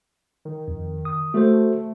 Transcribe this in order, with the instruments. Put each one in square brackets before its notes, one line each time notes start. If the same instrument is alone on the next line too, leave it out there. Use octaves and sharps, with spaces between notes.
[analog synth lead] D#3
[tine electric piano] F2
D#6
[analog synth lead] A3 [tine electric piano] F#4 A4 C5